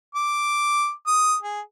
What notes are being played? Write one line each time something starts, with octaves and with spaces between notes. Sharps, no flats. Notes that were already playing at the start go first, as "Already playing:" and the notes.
D6
D#6
G#4